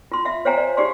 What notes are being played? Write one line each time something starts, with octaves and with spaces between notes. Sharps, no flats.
F4 C6
E5 F5
C5 C#5 F5 G5 G#5 A#5
D5
D#4 G4 G#4 D5 F5 C6